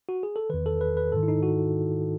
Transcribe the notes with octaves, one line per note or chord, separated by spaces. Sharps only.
F#4
G#4
A4
E2 D#3 B4
A4
B4
B4
G#2 D#3 A4
E4
D#4
F#4